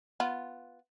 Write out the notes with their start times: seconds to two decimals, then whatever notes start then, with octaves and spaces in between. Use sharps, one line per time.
0.20 B3 F4